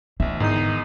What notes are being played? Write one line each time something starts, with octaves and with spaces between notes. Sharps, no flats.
A1 D3 E5
E2 G#2 D#3 D#4 C7